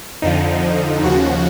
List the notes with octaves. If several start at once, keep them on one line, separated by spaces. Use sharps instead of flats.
F2 D3 F3 D#4
D#2 C#3 F3 F#4